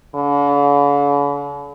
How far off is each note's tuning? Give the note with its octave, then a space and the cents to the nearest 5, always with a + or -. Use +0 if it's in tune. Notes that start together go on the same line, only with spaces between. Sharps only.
D3 -45